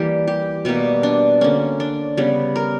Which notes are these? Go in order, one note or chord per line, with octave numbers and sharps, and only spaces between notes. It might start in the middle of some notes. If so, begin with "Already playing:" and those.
Already playing: E3 G3 A#3 G4
G4
B2 G3 A#3
D4
D3 A#3 C#4
D4
C#3 G3 B3
A#4